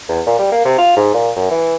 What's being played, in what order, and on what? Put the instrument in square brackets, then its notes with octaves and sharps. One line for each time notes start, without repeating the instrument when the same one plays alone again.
[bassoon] E2
A#2
G3
A#3
C3
F4
G#2
A#2
F#2
E3